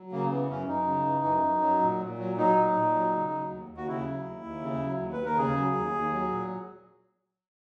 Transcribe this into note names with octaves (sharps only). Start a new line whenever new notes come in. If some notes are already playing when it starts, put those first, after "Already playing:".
Already playing: F#3
C#3 A#3
E3 B3
F#2 C#4
F#2 D#4
C#3
E3
F#2
F#2
F#3
A#2
A#2
F#3
F#3 D#4
A#2
A#2
F#3
C#3
F#3
D#2
D#2
F#4
C#3 E4
F#3
D#2
D#2
C#3
F#3
D#2
B4
D#2
A#4
C#3 G#4
F#3
D#2
D#2
F#3
A#2